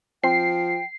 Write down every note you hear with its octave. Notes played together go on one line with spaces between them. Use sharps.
F3 C4 G5 C7